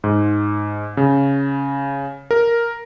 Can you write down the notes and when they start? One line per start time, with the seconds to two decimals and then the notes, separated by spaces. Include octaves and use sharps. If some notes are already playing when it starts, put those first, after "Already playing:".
0.04 G#2
0.97 C#3
2.31 A#4